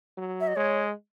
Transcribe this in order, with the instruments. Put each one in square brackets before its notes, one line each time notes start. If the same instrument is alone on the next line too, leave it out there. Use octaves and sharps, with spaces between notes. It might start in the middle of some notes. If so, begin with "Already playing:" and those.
[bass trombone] F#3
[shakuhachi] E5
D#5
[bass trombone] G#3 [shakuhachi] C#5